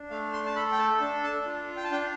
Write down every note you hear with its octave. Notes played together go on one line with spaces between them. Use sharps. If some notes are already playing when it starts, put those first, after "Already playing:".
Already playing: D4
A3 F5
C6
A5
A4 B5
G5
A5
D4 A5
A5
F4
G5
A5
D4 G5